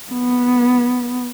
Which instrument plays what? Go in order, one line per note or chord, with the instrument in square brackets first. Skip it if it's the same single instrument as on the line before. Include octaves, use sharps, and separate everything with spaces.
[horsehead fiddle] B3